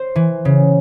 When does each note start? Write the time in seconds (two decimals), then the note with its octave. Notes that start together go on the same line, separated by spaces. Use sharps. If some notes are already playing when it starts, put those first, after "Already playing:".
Already playing: C5
0.15 E3
0.45 C#3